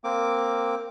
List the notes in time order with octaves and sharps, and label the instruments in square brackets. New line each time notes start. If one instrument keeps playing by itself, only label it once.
[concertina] A#3 C4 D6